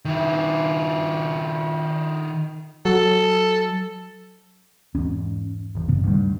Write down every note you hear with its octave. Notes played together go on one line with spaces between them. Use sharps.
D#3 E4
F#3 A4
E2 G#2 C#4
G#1 E2
G2 C#3 B3
D2 G2 D#3 G3